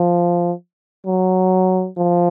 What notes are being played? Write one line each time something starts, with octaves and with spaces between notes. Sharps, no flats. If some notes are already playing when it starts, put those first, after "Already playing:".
Already playing: F3
F#3
F3